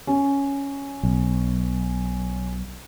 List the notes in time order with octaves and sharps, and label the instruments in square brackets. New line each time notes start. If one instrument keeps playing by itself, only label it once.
[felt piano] C#4
[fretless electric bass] B1